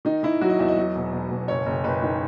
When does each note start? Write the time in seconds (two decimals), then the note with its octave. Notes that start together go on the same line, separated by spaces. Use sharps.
0.05 D#3 D#4
0.23 D#3 E4
0.41 F#3 F#4
0.50 D#5
0.59 E2 E5
0.68 D#5
0.76 F#3
0.96 E1
1.13 E1
1.31 E1
1.48 F#1 C#5
1.66 F#1
1.84 F#1 B4
2.02 D#3